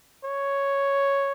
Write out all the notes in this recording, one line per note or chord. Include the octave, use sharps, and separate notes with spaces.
C#5